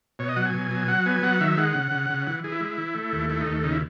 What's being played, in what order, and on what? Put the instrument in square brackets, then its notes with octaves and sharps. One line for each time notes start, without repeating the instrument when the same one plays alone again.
[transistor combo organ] B2 C#5
D#5
F#3 F#5
G#5
B2
F#3
F#3 F#5
B3 G#5
F#3 F#5
D#3 E5
G#3 F#5
C#3
C#3
C#3
E3 F#5
E3 G#4
E4
G#3
E3
A3
D#2
A3 E4
D#4
D#2
C#3 D#4
E4